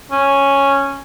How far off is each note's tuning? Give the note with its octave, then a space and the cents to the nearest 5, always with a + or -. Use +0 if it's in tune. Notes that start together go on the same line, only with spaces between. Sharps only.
C#4 -5